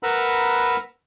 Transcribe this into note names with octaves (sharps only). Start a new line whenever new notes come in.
A#4 B4 F#5 A#5 B5 E6